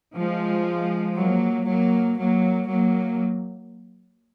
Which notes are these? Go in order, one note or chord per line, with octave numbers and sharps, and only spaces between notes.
F3 G#3
F#3 A#3
F#3 A#3
F#3 A#3
F#3 A#3